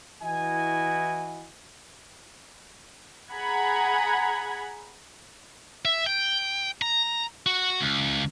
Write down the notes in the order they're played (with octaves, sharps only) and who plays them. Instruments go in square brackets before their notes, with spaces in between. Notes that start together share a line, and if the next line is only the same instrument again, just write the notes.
[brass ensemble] E3 E4 F#4 D#5 G#5
[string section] G#4 F#5 A#5 B5 G#6
[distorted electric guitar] E5
G5
A#5
F#4
C#2